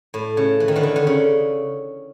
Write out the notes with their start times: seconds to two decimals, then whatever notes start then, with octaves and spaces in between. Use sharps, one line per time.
0.14 A2
0.37 C#3
0.60 E3
0.68 D#3
0.76 D3 E3
0.83 D#3
0.96 D3
1.07 C#3